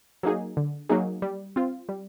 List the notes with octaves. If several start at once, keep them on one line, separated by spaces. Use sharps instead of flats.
F#3 A#3 D#4 G#4
D3
F#3 A#3 D#4 G#4
G3
C4 F4
G3